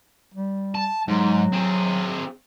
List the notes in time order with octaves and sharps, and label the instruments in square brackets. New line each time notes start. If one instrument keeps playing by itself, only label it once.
[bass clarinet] G3
[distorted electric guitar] A5
[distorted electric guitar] G#2 [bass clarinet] F#3
[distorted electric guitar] C4 G#4